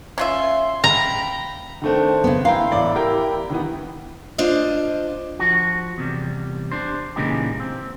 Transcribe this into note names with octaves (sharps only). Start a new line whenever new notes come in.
C#4 F4 E5 C6
G5 A#5 B5
D#3 A3 C4 D4
C#3 B3
E4 F5 G5 A#5 C6
A1 D5
G4 A#4 G5
D#3 E3 B3
D4 F4 C5 D#5
F3 F#4
E2 C3 G3
D4 C5
A#2 C#3 E3 G#3 D#4 G4
C4